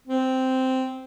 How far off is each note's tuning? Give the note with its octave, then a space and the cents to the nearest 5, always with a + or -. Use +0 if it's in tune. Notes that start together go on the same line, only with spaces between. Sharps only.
C4 -5